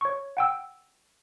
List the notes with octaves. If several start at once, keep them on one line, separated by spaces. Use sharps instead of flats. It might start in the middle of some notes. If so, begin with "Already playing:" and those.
C#5 C#6
F#5 G5 E6